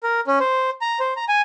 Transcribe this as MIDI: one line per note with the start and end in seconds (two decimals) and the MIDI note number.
0.03 0.20 70
0.27 0.39 61
0.40 0.70 72
0.81 0.99 82
1.00 1.14 72
1.17 1.25 82
1.28 1.42 80